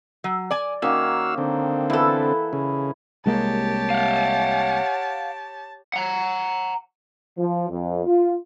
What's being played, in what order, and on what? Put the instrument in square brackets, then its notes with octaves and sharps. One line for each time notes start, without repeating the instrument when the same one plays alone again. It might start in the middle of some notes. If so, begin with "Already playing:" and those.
[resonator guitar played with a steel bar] F#3
D5 G#5
[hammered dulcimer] D#3 A#3 D#4 [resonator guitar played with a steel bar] C#4 [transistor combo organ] F#4 F5 E6
[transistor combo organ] D3 C4
[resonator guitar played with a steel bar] E2 A4 [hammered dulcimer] E4 B4
[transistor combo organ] C#3
[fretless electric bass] C2 G#3 A#3 [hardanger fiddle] G4 C#5 [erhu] A5
[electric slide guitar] F5 F#5
[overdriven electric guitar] F#5 A#5
[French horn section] F3
F2
F4